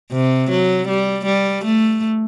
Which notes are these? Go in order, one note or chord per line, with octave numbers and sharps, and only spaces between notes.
C3
F#3
G3
G3
A3